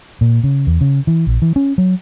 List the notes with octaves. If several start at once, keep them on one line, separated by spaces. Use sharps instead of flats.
A#2
C#3
E2
C#3
E3
A#1
E3
C#4
F#3